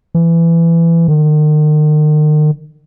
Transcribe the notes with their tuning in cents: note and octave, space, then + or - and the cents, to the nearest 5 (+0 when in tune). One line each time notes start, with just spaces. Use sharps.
E3 +20
D#3 -40